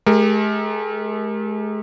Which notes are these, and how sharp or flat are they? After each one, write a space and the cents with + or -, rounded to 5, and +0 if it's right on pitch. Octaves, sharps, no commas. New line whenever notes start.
G#3 +45 G4 +35 A#4 +0